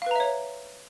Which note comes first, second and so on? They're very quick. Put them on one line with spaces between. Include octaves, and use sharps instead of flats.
F5 B4 A#5 E5 C#5